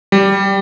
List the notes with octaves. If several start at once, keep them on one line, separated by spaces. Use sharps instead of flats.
G3